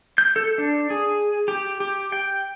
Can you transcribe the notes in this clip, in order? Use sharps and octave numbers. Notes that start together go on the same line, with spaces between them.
G6
A4
D4
G#4
G4
G4
G5